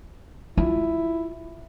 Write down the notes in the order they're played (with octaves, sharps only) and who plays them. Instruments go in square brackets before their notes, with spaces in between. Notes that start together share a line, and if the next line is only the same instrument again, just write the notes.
[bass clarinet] E4 [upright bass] F4